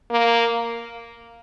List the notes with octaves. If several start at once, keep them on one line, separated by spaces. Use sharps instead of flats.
A#3